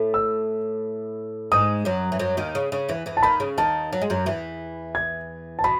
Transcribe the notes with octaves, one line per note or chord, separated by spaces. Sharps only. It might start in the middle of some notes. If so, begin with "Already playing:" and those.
Already playing: A2 A3
E6
G#2 G#3 D#6
F#2 F#3
E3
F#2 F#3
D#2 D#3
C#3
C#3
E2 E3
E2 E3
A5
D#2 D#3 B5
C#3
D#2 D#3 A5
F#3
G#3
F#2 F#3
E2 E3
G#6
A5
B2 B5